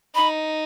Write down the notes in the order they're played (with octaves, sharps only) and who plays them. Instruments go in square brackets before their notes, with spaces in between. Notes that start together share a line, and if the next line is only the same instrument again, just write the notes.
[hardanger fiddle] D#4 [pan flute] B5